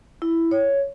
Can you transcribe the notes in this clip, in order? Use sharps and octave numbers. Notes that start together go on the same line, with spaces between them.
E4
C#5